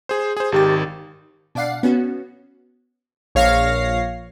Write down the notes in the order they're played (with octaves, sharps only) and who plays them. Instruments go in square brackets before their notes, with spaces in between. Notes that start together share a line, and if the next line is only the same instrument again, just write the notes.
[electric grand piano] G#4 C5
G#4 C5
[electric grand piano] G#1 D#3 A6 [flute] G4
[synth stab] B2 D4 D5 F5 F#5 C7
B3 C#4 F#4
[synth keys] A#1 C#5 F5 F6 A#6 C7